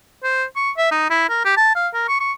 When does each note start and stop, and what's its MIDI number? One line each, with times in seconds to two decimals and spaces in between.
0.23 0.44 72
0.56 0.71 85
0.77 0.89 76
0.91 1.08 63
1.10 1.28 64
1.29 1.42 70
1.45 1.53 67
1.57 1.71 81
1.75 1.88 77
1.94 2.07 70
2.08 2.17 85
2.20 2.32 85